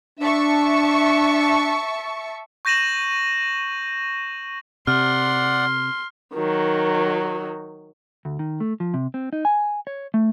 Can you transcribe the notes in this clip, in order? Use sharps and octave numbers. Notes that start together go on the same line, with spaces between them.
D4 E5 A5 C#6
C#6 G6 A#6 D#7 E7 F#7
C3 D5 F#5 C6 F6
D#3 F#3
D2
D#3
A3
F3
C3
C4
D#4
G#5
C#5
A3